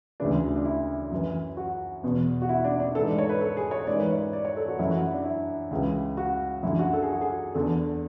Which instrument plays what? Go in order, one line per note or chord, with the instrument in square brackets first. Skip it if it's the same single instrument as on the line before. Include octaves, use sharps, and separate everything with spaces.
[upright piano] D2 C#3 E3 D4
D4
E4
F#2 E3
F#4
E2 B2
F#4
E4
D4
D4
G#2 E3 A4
D5
C#5
B4
A4
G#4
C#5
G#2 E3 D5
B4
C#5
D5
C#5
A4
F#4
F#2 E3 E4
F#4
E4
D4
E4
C#2 C#3 E3
F#4
F#2 D3 E4
F#4
A4
G#4
F#4
G#4
E2 D3 A4